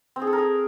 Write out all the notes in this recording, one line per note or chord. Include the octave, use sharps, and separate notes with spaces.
C4
G#4
A4
A#4
G#4